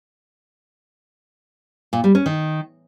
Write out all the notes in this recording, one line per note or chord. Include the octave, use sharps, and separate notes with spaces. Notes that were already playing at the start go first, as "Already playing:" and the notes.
A#2
G3
C#4
D#3